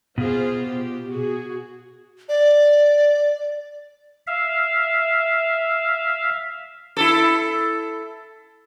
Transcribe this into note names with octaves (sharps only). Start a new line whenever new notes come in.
B2 F4 G#4 C5
G4
F#4 G#4
D5
E5 F5
E4 A4